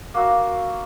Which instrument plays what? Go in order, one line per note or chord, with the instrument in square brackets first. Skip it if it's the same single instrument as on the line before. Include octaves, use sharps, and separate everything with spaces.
[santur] A#3 F#4 E5